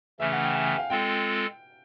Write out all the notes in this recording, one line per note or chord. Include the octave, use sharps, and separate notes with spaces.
C#3 E3 A3 C#4 E5
F#5
G5
G#5
G5
F5
G#3 C4 F4 A4 G5